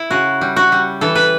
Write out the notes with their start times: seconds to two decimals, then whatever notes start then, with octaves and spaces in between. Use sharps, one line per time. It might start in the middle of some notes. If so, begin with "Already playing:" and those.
Already playing: E4
0.11 C#3 F#4
0.41 G3
0.56 F#4
0.72 G3
1.01 E3 A4
1.15 B4